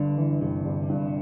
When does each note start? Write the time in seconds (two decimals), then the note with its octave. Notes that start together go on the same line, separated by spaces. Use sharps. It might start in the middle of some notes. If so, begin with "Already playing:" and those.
Already playing: G1 G2 D3
0.18 E3
0.41 G1 C3
0.65 G1
0.89 G2